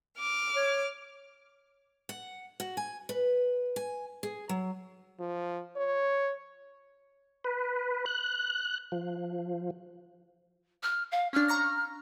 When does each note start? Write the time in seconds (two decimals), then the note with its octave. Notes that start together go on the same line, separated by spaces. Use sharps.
0.18 D6 F6
0.56 C#5
2.09 F#5
2.60 F#4
2.77 G#5
3.09 B4
3.76 G#5
4.23 G#4
4.49 F#3
5.20 F3
5.76 C#5
7.44 B4
8.06 F#6
8.92 F3
10.83 F6
11.12 F5
11.33 C#4 D4 F6
11.48 A#5 C#6 A#6